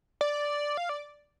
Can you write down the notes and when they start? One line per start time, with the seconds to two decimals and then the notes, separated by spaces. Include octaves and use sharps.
0.21 D5
0.77 F5
0.89 D5